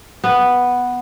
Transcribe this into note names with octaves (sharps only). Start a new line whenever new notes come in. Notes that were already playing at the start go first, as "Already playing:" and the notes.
B3